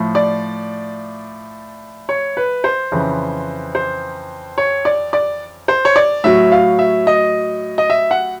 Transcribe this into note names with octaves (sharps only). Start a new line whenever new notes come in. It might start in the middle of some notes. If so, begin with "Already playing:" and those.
Already playing: A2 F3
D5
C#5
B4
C5
F2 C#3 E3
C5
C#5
D5
D5
C5
C#5
D5
A2 F#3 E5
F5
E5
D#5
D#5
E5
F#5